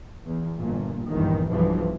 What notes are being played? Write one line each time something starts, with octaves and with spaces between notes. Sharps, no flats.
E2
G1 A#2
A#1 E2 G2 D#3
B1 E2 G2 B2 E3 F3